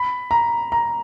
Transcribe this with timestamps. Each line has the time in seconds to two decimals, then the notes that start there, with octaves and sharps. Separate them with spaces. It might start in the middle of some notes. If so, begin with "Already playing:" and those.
Already playing: B5
0.31 A#5
0.72 A#5